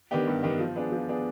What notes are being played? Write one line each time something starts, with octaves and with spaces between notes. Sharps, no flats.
D#3 B3 D4 G4
G2
D#3 B3 D4 G4
F3
B3 D4 G#4
F3
B3 D4 G#4